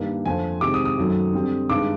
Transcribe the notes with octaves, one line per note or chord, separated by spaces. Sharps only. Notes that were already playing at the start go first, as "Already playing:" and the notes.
Already playing: G2 D#3 G3 A#3
F2 D3 F3 A3 G#5
C3 D#3 G#3 D6
D#6
D#6
F#2 D#3 F#3 A3
D3 G3 C4
G2 D#3 G#3 D6